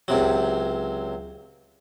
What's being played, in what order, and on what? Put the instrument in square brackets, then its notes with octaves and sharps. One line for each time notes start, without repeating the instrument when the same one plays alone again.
[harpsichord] C#2 C3 F#3